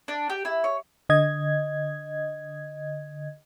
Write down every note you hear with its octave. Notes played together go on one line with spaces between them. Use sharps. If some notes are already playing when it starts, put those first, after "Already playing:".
D4
G4
E4
C#5
D3 D#5 G#6